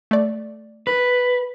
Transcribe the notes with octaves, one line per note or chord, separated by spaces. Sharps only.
A3 D5
B4